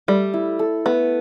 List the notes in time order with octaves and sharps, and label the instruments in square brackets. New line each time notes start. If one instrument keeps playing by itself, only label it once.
[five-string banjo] G3 [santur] A3
[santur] E4
A4
[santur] A3 [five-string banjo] B3